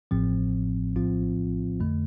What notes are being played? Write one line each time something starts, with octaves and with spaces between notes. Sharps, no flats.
A1 A2 F3 C4
A#1 A2 F3 C4 F4
F2 D3 A3